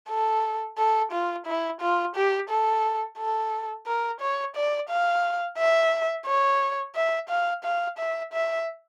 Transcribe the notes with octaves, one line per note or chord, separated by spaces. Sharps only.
A4
A4
F4
E4
F4
G4
A4
A4
A#4
C#5
D5
F5
E5
C#5
E5
F5
F5
E5
E5